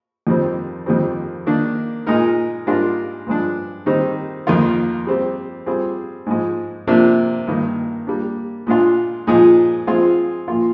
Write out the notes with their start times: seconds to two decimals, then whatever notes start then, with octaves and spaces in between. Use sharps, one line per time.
0.27 F2 D#3 G3 C4
0.86 F2 D#3 G3 C4
1.46 D#3 A#3 D4
2.07 A#2 G#3 D#4 A#4
2.67 G#2 G3 D4 F4 A#4
3.27 G2 F3 G#3 D4
3.86 D#3 G3 C4 D#4
4.47 F2 D#3 A#3 F4
5.07 G3 C4 G4
5.66 G3 C4 F4 G#4
6.26 G#2 F3 G#3
6.87 C3 F3 A#3 D4
7.47 G2 D#3 A#3
8.07 G3 A#3 D4
8.67 A#2 G#3 D4 F4
9.27 A#2 F3 G#3 D#4 G#4
9.87 F3 G#3 C4 F4 G#4
10.48 A#2 F3 A#3 F4